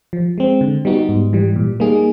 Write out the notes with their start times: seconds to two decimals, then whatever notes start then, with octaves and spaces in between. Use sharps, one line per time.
0.13 F3
0.38 G#3 C4
0.61 D3
0.85 G3 B3 D#4 F#4
1.09 G#2
1.33 E3 G3
1.56 A#2
1.80 G3 A#3 D#4 G#4